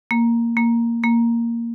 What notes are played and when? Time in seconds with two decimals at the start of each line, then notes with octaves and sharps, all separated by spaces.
0.11 A#3
0.57 A#3
1.03 A#3